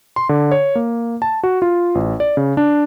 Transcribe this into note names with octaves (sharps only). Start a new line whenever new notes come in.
C6
D3
C#5
A#3
A5
F#4
F4
A1
D5
C#3
D4